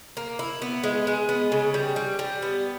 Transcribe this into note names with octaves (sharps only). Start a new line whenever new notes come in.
A#3
E4
B3
G#3
G#3
B3
C#3
G3
G3
G3
B3